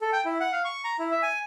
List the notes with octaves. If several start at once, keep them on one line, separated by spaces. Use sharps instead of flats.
A4
G5
E4
F#5
F5
C#6
A#5
E4
E5
G#5